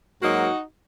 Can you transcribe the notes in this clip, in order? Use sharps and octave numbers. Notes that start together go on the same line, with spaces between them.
G#2 F#3 A#3 D#4 F#4